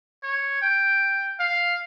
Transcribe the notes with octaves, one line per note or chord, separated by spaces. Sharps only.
C#5
G5
F5